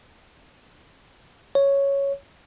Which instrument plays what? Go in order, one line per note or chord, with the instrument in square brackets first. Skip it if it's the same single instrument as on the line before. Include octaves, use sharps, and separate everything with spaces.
[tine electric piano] C#5